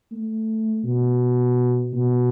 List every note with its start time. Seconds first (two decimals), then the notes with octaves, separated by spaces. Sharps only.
0.12 A3
0.84 B2
1.93 B2